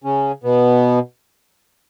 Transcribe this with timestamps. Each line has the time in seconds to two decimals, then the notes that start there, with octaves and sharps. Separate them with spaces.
0.04 C#3 C#4
0.44 B2 B3